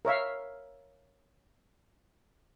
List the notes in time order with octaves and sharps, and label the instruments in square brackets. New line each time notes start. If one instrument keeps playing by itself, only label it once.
[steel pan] A#4 C#5 E5 F5